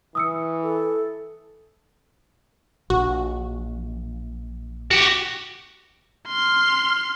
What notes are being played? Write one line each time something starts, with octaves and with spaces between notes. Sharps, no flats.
E3 D#6 E6 C#7
A4
A#1 F#4
F#4 G4
C6 F6